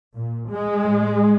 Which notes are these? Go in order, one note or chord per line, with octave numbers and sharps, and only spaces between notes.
A#2
G#3
A2